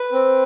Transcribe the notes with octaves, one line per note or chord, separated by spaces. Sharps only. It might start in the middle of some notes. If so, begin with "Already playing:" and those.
Already playing: B4
C4